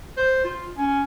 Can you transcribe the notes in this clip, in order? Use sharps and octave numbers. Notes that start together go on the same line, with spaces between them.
C5
F4
C#4